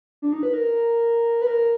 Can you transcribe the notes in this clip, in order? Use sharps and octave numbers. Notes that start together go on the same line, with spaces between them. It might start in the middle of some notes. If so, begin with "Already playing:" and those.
D4
D#4
B4
A#4
B4
A#4